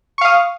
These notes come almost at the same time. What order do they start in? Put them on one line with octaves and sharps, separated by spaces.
C#6 F5 D#6